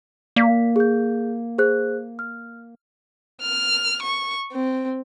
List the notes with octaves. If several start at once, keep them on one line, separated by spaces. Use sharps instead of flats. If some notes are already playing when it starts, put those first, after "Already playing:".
A#3 D5 B6
G#4 G6
G#4 C5 F#6
F6
F6
C#6
C4